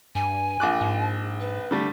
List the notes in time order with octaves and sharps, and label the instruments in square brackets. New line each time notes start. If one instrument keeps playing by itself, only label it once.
[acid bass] G2 [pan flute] G#5
[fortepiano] A#1 D6 F#6
[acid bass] G#2
[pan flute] B4
[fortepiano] D3 G3 A3